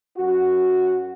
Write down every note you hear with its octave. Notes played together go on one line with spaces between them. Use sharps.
F#2 F#4